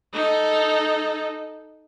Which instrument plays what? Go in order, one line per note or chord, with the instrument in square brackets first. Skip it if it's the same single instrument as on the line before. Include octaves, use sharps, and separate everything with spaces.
[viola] D#4 A4